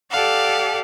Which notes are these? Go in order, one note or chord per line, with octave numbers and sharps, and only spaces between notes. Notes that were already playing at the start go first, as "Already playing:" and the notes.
G4 A4 D5 F5 F#5